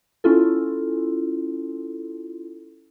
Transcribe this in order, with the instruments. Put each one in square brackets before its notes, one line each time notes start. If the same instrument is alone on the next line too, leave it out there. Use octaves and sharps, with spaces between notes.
[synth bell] C#4 E4 F4 A4